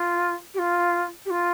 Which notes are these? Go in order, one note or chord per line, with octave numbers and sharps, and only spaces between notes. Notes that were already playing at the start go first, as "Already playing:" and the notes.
Already playing: F4
G4
F4
G4
F4